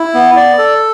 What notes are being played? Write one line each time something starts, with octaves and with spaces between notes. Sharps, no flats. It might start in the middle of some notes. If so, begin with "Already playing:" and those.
Already playing: E4
B3
D5
A4